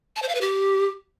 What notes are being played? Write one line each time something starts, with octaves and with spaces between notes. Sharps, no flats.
A5
C5
F5
B4
G4